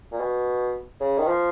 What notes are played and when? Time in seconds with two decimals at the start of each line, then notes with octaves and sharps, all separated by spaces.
0.12 A#2
0.20 B2
1.00 C#3
1.18 D#3
1.27 F3